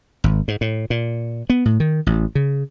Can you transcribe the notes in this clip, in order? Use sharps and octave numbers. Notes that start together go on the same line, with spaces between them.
G#1
G#2
A2
A#2
B3
A2
D#3
A1
C#3